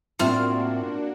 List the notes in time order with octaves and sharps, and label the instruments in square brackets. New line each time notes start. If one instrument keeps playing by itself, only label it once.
[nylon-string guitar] A2 C4 E5 [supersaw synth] A#3 D4 F#4 [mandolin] F4 F6